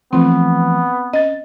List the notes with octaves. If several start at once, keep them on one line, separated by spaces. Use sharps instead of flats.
E3 F3 A3 B3 C4
C#4 D#5 A6